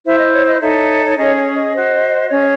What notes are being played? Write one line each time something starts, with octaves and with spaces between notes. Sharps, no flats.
E4 C5 E5
D#5
C#5
D#5
D#4 A4 C#5 E5
C#5
C#4 G#4 C#5 D#5
C#5
D#5
F#4 C5
C#4 G#4 C#5